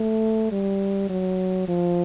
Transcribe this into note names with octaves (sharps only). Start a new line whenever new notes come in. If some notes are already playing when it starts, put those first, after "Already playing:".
Already playing: A3
G3
F#3
F3